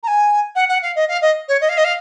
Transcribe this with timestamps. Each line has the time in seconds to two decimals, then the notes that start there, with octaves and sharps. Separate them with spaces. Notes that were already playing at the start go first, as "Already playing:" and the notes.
0.03 A#5
0.07 G#5
0.55 F#5
0.69 F#5
0.82 F5
0.95 D#5
1.08 F5
1.22 D#5
1.48 C#5
1.61 D#5
1.69 F5
1.77 D#5
1.84 F5